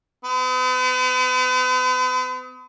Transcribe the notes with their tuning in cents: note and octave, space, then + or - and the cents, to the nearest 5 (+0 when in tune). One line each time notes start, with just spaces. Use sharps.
B3 +45